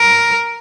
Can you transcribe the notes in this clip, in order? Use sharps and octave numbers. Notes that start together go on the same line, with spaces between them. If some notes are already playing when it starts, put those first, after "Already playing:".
Already playing: A#4